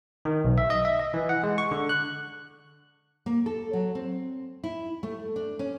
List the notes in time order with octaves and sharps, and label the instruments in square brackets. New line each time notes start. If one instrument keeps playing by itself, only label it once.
[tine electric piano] D#3
B1
E5
D#5
E5
D#5
E3
F#5
G#3
C#6
D3
F#6
[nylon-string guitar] A#3
A4
F#3
C4
E4
A3
D4
C#4